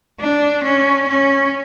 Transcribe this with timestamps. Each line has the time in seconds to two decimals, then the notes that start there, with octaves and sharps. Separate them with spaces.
0.20 D4
0.64 C#4
1.09 C#4